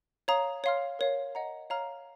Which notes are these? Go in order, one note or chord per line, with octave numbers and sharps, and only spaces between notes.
C#5 F5 A#5 D#6
C#5 F5 C6 F6
A#4 C#5 F5
D#5 F#5 A#5
C#5 F5 A#5 F6